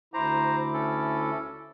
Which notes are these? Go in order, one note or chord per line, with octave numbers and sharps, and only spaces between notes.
D2 E4 C5 A#5 D6
C#4 A4